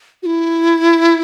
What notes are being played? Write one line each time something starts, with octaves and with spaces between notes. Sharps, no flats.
F#4
E4